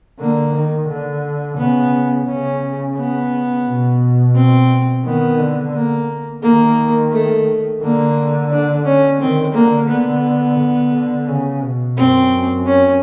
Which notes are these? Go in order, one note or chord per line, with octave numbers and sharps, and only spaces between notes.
D3 A#3
D#3
D3
C#3 B3
C#3 C#4
B3
B2
C4
D#3 B3
D3
A#3
D#3 A#3
A3
D3 A#3
D4
C#4
D#3 C4
D3 A#3
D3 B3
D3
D3
C#3
B2
F#2 C4
C#4